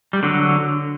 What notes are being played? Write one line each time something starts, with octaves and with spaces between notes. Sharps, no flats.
G3
D3 F#3